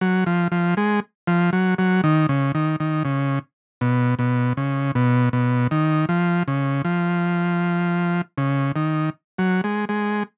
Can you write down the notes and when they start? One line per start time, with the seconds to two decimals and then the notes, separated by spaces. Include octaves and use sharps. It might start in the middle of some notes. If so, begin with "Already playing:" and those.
0.01 F#3
0.26 F3
0.52 F3
0.77 G#3
1.27 F3
1.53 F#3
1.78 F#3
2.04 D#3
2.29 C#3
2.55 D#3
2.80 D#3
3.05 C#3
3.81 B2
4.19 B2
4.57 C#3
4.95 B2
5.33 B2
5.71 D#3
6.09 F3
6.48 C#3
6.85 F3
8.38 C#3
8.76 D#3
9.38 F#3
9.64 G#3
9.89 G#3